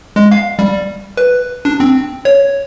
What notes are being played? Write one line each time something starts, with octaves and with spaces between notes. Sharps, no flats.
G#3
F5
G3
B4
D4
C4
C#5